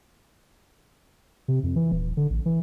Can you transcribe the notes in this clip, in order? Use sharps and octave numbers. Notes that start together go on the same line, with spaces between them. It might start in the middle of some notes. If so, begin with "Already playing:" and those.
C3
F2
E3
D#1
D3
A1
E3